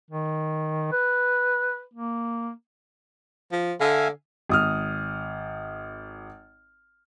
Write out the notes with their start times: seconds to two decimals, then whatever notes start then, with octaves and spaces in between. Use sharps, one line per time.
0.10 D#3
0.92 B4
1.94 A#3
3.52 F3
3.80 D3 E5 F5 G#5
4.49 G#1 D#6 F6